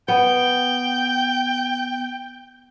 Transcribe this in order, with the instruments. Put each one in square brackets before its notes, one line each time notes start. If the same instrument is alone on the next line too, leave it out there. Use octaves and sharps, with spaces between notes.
[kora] B3 [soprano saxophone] G5